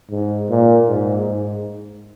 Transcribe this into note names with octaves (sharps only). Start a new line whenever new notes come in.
G#2
A#2
G#2
G#2